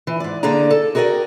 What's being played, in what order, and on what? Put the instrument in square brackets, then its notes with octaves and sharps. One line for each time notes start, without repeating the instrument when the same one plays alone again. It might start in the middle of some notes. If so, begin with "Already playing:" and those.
[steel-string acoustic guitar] E3
G#2 D5
D3 A#3 D4 G#4 D5 A#5
A4
F#4 G#4 A#4 C#5 D5 G5